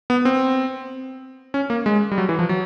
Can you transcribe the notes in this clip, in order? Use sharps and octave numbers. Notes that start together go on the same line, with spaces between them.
B3
C4
C#4
A#3
G#3
G3
F#3
E3
F3
F#3